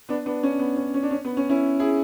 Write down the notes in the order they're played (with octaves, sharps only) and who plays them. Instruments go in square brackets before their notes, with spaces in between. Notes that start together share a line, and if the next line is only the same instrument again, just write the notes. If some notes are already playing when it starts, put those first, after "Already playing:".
[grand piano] B3 D4
B3 D4
C#4
B3
C#4
C#4
D4
C#4
B3
C#4
C#4 E4
E4 G#4